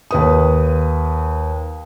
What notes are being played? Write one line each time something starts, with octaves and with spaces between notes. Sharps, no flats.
D#2 B4 D#6